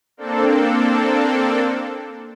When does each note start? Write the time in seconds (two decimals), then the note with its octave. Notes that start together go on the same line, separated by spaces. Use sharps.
0.17 A#3 C4 D4 A4